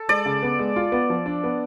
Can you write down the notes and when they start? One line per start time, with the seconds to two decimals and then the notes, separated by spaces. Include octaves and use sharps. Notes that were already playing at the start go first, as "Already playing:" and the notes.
Already playing: A4
0.09 G#3 D5
0.26 C#3
0.43 B3
0.59 G#3
0.76 F4
0.92 B3
1.10 F3
1.26 D4
1.44 B3